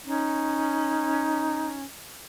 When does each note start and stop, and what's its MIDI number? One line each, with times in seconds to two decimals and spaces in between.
0.05 1.83 61
0.05 1.79 63